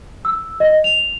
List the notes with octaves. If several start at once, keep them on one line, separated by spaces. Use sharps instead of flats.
E6
D#5
F7